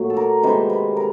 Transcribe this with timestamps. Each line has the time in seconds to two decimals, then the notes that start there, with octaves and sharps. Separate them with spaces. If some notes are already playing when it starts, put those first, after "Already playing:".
Already playing: A#2 F#3 A3
0.10 A4
0.17 A#4
0.43 C3 D#3 G#3 B4
0.70 B4
0.97 A#4